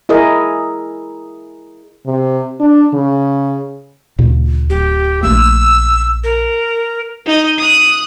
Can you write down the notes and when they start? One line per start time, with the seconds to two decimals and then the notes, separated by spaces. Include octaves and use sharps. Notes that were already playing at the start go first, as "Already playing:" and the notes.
0.09 E4 G#4 A#4 D#5
2.06 C3
2.60 D4
2.94 C#3
4.18 D2 A#2 C#3
4.70 D1 G4
5.23 A#1 A3 A#3 E6
6.24 A#4
7.26 D#4 D#5
7.58 D#6 F#6